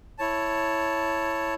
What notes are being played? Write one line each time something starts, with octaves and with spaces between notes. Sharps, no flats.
E4 C#5 A5